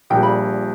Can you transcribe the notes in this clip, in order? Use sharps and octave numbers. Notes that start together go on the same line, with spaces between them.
A#1 A#2 G3 G5
B5